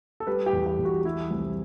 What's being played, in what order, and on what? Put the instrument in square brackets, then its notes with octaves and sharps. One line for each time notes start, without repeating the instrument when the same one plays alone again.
[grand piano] A4
G3 B4
G4
E2
G4
E2
F#4
G3 E4
C2 E4